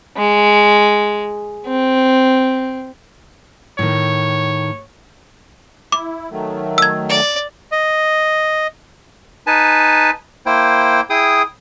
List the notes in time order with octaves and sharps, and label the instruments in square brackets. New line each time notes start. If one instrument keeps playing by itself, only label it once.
[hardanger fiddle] G#3
C4
[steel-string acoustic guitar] A2 D#3 [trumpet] C#5
[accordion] E4 [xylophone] D6
[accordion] D#3 F#3 A3
[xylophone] E6 G#6
[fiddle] D5
[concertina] D#5
D#4 B4 G#5 A5
A#3 E4 C5 G5
E4 G#4 G5 D#6